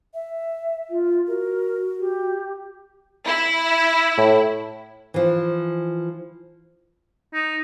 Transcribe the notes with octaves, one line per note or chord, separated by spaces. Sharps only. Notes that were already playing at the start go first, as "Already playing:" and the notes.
E5
F4
F#4 A#4
G4
E4
A2
E3 F3
D#4